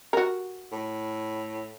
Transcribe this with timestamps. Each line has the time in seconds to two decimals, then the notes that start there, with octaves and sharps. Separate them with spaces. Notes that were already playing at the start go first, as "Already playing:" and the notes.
0.13 F#4 A#4
0.72 A2